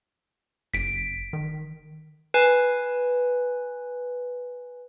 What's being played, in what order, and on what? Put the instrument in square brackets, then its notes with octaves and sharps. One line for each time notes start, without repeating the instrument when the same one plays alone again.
[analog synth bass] F#1 [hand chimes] B6 D7
[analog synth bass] D#3
[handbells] B4 G#5